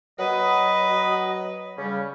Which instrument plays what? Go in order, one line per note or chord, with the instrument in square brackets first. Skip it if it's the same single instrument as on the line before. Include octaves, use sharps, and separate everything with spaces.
[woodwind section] F#3 D#5 [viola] B4
[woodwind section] C#3 G3 C#4